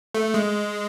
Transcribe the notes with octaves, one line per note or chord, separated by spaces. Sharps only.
A3
G#3